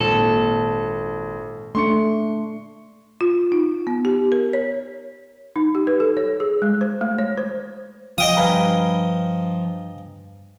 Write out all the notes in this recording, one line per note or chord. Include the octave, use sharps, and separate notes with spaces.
G#1 A#2 A4
A3 D4 C6 C#6 C#7
F4
D#4
B3
G4
A#4
C#5
D#4
G4
B4
A4
C#5
G#4
G#3
C5
A3
C#5
C5
F3 D#5 F5 G5 D#6
G2 B4 F5 G#5 A#5